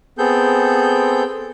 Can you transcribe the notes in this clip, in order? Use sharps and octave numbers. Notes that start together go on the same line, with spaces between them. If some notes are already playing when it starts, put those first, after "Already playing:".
B3 C4 G#4 A4 G6